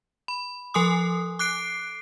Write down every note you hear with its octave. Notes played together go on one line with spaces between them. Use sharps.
B5
F3 A4 G#5 C6 D#6
D6 F#6 C7 D7